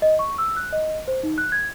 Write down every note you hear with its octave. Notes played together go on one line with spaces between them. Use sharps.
D#5
C#6
E6
F#6
D#5
C5
D#4
F#6
G#6